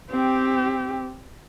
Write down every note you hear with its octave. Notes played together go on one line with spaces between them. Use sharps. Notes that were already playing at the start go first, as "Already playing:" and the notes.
C4 G4